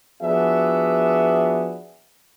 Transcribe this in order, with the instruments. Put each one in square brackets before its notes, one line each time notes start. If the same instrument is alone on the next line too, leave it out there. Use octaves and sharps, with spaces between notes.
[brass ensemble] F3 B3 D4 F#4 G#4 E5